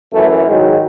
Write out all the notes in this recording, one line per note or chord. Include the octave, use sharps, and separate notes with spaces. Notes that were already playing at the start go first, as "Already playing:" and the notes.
F#2 E3 A3
G#2 D#3 F#3 G#3